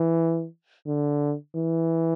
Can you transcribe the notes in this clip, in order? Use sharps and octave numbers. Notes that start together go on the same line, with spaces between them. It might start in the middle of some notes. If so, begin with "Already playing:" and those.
Already playing: E3
D3
E3